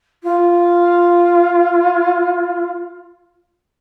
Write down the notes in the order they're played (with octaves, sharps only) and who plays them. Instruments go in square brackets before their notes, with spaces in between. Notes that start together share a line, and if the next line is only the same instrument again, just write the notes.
[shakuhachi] F4